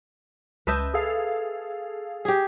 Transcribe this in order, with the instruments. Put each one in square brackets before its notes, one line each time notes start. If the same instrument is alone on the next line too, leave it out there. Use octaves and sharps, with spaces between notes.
[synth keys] C#2 A5 G6 [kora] B4 D#5 E5
[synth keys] G#4 A4 F5
[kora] G4 G#4